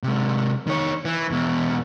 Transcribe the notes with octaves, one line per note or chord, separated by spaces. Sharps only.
C3 G#3
D#3 C#5
E3
E2 B2